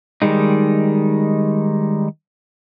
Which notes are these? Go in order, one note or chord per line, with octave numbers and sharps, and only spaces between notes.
D#3 G3 G#3 D#4